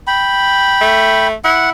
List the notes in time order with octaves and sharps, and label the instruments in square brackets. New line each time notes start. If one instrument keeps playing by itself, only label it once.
[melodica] G5 B5
[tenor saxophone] A3
[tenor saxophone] E4 [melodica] F#5